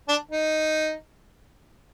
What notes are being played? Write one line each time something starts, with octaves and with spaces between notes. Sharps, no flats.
D4
D#4